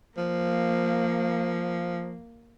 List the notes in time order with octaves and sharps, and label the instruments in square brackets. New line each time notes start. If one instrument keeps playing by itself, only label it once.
[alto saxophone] F3 [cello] A#3